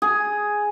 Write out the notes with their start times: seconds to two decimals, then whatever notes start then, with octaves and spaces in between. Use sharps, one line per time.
0.02 G#4